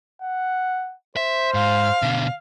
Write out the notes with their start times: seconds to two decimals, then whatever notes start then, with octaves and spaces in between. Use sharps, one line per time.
0.22 F#5
1.17 C5 E5
1.54 G#2 F5
2.02 B2 D3